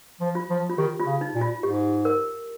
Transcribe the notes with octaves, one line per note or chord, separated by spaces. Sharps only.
F3
F4
F3
F4
D#3 G4
F4
C#3
D#4
A#2
F4
G#2 G4
A#4